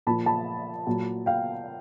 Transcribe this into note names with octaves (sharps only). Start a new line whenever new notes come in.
A#2 F3 A5 B5
A5 B5
A#2 F#3
F5 G5